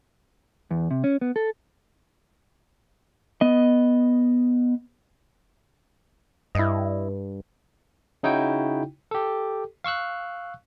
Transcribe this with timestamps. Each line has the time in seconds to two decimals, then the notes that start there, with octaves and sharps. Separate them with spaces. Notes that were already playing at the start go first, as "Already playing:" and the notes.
0.71 E2
0.91 C3
1.04 C#4
1.21 B3
1.36 A4
3.41 B3 D#5
6.55 G2 E4 D#5
8.23 C#3 D#4 E4 F#4 G5
9.11 G4 A4
9.84 F5 C#6 E6 F#6